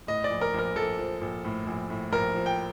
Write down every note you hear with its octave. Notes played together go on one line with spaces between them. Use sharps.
A2 D#5
D5
A#1
A#4
A#1 A#4
A#1 A4
F3
A#1
A2
A#1
A2
A#1 A#4
F3
G5